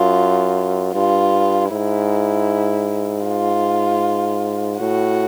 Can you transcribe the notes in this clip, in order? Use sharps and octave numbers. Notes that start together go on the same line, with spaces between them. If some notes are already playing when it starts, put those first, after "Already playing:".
Already playing: F#2 F4
G2 F4
G#2 E4
F4
A2 F#4